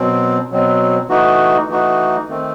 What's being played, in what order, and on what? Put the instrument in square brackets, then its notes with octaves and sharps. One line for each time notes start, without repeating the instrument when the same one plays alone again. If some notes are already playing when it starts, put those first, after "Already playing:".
Already playing: [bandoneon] B2 F#3 C4
B2 F#3 C4
E3 A3 D#4 F#4
E3 A3 D#4 F#4
D#3 A3 C4